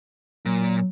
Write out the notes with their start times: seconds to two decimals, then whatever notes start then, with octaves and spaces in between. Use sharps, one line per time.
0.46 A#2 F#3